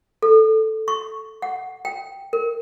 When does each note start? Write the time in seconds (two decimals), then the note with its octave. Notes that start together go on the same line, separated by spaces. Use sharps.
0.22 A4
0.88 C#6
1.42 F#5
1.85 G5
2.33 A#4